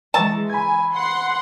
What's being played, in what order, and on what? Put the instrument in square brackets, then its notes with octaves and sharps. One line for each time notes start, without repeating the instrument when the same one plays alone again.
[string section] E3 G#3 [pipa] A5 [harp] A#5 C#6 E6
[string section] G#5 [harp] B5 G#6
[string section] F#5 C6